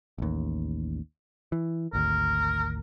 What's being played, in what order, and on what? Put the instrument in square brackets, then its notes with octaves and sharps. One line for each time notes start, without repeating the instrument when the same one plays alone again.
[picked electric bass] A1 D#2
E3
[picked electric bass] G#1 D2 [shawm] A#4